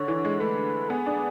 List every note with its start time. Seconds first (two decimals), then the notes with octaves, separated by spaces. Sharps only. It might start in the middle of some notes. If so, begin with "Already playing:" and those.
Already playing: D3 C#5
0.08 E3
0.25 G#3
0.40 A3 B4
0.90 B3 G#4
1.06 D4